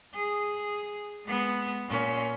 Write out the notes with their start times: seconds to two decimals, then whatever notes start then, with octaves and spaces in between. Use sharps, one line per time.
0.15 G#4
1.26 G#3 B3
1.89 A#2 C#4